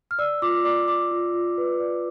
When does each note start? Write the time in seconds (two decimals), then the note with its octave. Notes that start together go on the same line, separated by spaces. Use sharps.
0.11 F6
0.19 D5 E6
0.42 F4 D6
0.64 D5 D6
0.87 D5 D6
1.11 F4
1.34 F4
1.58 B4
1.80 D5